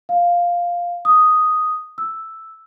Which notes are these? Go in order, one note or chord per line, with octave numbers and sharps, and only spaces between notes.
F5
D#6
E6